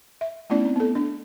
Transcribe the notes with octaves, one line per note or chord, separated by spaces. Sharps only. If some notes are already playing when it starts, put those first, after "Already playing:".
E5
A3 B3 C#4 D#4 E4 D5
C4
B3 A4
D4